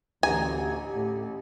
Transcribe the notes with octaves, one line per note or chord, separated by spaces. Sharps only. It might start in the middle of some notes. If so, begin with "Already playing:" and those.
A1 D2 G4 G#5 A#5
A2